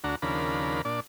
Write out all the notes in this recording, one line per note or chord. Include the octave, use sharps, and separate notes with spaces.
D2 D4 F#4 A#5
D#2 C#3 F3 D4 A#4 B5
A#2 D4 D5